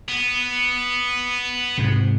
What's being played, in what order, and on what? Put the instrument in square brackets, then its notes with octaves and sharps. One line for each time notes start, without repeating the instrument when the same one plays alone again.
[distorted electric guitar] B3
[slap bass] G#2 C3